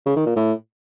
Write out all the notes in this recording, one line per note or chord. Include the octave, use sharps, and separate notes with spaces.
C#3
D#3
A#2
A2